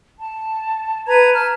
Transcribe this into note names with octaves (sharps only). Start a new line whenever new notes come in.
A5
B4 A#5 G#6
A5 F6